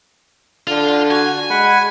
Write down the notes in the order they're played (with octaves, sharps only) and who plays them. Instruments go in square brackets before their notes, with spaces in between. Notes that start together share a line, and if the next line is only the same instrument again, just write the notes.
[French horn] D3 [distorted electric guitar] F4
[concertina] F#4 [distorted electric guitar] G#5
[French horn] G#3 [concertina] F#5 B5